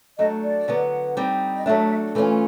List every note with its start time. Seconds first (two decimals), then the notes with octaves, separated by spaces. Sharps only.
0.18 F#3 A3 D4 D#5
0.44 D5
0.68 D3 F#3 B3
1.17 G3 C4 D#4
1.55 D#5
1.65 F#3 A3 D4 E5
2.15 E3 A3 C#4 F4